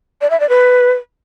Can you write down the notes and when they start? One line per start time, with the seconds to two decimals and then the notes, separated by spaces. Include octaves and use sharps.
0.21 D5
0.30 E5
0.40 D5
0.49 B4